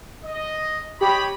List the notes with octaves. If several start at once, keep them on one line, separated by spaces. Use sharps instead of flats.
D#5
G4 C#5 D#5 B5